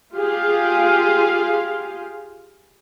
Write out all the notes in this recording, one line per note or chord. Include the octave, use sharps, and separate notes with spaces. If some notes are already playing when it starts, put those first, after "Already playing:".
F4 G4 G#4 F5